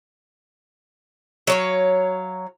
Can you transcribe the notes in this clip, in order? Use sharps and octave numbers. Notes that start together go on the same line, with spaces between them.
F#3 C#5 F5